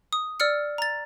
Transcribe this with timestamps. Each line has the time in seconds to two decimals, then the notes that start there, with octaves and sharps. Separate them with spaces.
0.13 D#6
0.40 D5 E6 F6 C#7
0.78 A#5 A6